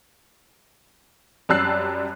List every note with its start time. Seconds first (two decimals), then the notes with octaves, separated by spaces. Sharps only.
1.49 F#2 G3 A5 E6 F#6 C7